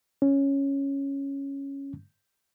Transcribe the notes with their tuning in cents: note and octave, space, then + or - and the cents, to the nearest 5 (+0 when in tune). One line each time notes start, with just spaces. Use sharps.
C#4 -5